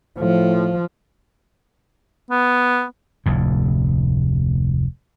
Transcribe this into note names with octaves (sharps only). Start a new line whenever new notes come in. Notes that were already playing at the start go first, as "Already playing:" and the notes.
A2 F3
B3
F1 D2 A2